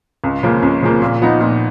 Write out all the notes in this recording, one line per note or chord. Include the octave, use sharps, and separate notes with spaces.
C#2
C#3 F3 A#3
C#2
C#3 F3 A#3
A#2
F3 B3 D#4
A#2